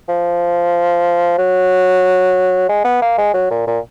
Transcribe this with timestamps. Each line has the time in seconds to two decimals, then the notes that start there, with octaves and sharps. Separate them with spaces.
0.09 F3
1.38 F#3
2.69 G#3
2.85 B3
3.02 A#3
3.18 G#3
3.34 F#3
3.51 A#2
3.67 A#2